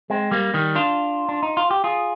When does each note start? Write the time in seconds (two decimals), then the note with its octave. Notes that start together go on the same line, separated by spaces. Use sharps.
0.10 G#3 C4
0.31 G3 A#3
0.54 D#3 G3
0.75 D4 F4
1.29 D4
1.43 D#4
1.57 F4
1.71 G4
1.84 F4 G#4